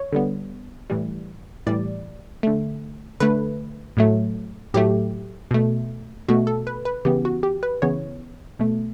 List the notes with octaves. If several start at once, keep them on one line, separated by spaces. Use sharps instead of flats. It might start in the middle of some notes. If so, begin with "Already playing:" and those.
Already playing: C#5
D3 G3 B3
A2 E3 G3
A2 E3 G3 D5
D3 A3
D3 A3 B4
A2 F#3 A3
A2 F#3 A3 G4
B2 A3
B2 A3 F#4
A4
B4
B4
C#3 E3 B3 G4
F#4
G4
B4
C#3 E3 B3 C#5
B2 A3